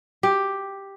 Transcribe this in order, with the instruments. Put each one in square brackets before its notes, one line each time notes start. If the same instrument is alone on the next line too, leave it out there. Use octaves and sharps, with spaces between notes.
[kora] G4